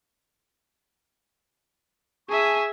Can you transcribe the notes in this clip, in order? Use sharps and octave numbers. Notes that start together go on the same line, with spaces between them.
G#4 E5 G#5 A5 C#6